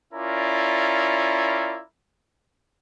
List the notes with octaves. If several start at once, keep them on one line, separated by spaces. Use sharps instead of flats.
C#4 E4 F4 A#4 D5